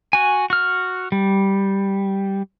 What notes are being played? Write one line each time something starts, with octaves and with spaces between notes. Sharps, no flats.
F#4 G#5
F#4 F6
G3